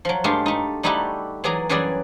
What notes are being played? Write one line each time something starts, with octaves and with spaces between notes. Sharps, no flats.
F3 F#3
G2 G#3 A3 F4 G4
A3 D#4
G3 A3 D#4 E4 F#4 G4
E3 F#3 G#4 D5 A#5
F#2 E3 F#3 G3 G#4 D5